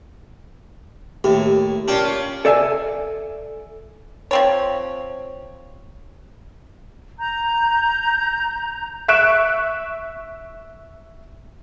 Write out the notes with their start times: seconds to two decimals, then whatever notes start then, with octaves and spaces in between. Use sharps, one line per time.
1.24 D#2 A2 G4
1.88 A#3 C#4 D4 F4 G5
2.45 A4 D5 E5 F5 G#5
4.31 F3 C4 C#5
7.19 A#5 G6
9.08 E5 C#6 F#6 D7 E7